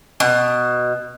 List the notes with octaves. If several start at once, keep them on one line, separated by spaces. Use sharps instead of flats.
B2